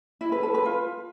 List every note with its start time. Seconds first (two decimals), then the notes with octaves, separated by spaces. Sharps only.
0.21 E4
0.32 B4
0.43 A4
0.54 B4
0.66 F4